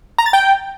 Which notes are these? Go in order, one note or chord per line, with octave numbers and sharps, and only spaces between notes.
A#5
A6
G5